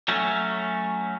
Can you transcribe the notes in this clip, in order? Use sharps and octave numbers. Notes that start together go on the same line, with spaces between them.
F#3 A3 C#4